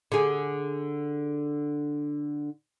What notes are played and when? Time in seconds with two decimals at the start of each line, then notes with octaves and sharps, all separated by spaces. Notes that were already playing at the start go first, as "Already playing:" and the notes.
0.12 D3 G#4